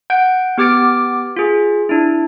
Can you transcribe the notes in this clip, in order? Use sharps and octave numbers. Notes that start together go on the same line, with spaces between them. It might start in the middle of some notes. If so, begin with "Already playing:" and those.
F#5 G6 D7
B3 G4 D6 F6 A6 D7
F4 G#4
D4 E4